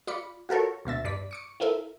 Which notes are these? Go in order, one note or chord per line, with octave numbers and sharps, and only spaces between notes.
F4 D5 B5 C#7
F4 F#4 A4 A#4 C#5
D2 B2 E5 A6
G2 D5 B6
C#6 D6 C#7
E4 F4 A4 A#4 E5